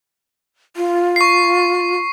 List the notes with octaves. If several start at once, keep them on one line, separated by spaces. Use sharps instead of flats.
F4
C#6 C7